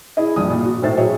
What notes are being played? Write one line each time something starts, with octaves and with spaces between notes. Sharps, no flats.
E4 G#4 D#5
A#1 G2 D#6
A#2
F#4
A2 C4 D#4 C5 E5 A6
F#3 C4 G#4 C#5 D#5 E5